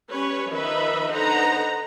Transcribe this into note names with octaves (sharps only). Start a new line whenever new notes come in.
G3 C#4 B4 C#5
D#3 F3 D#4 B4 E5 B5
D3 D#4 B4 C5 F#5 A#5